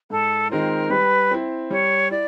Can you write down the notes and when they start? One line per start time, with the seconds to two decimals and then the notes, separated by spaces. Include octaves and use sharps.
0.10 G#2 A4
0.50 D#3 G#3 C4 F4 A#4
0.90 G3 B4
1.31 C4 E4
1.70 G3 C#5
2.11 E4 D5